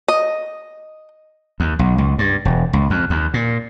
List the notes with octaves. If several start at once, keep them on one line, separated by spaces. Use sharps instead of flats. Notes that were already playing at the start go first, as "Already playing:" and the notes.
D#5
D#2
B1
C#2
G2
E1
C#2
F2
D#2
A#2